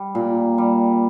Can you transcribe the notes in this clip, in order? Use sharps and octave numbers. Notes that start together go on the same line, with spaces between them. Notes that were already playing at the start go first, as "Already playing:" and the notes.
Already playing: G3
A#2
G3